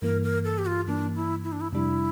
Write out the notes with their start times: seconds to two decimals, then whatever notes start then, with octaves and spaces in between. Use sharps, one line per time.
0.02 G2 E3 A#3 A#4
0.24 A#4
0.44 A4
0.58 G4
0.66 F4
0.87 G2 E3 A#3 D4
1.15 E4
1.44 E4
1.52 D4
1.61 E4
1.72 F2 C3 G3 D4 E4